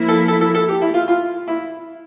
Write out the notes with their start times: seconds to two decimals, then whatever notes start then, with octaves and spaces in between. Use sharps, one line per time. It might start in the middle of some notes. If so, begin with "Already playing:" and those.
Already playing: F3 A#3 E4
0.08 A4
0.28 A4
0.41 A4
0.55 A4
0.69 G4
0.82 E4
0.94 F4
1.08 F4
1.48 E4